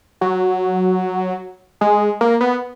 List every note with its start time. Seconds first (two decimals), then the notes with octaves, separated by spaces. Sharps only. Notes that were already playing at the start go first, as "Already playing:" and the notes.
0.21 F#3
1.81 G#3
2.21 A#3
2.41 B3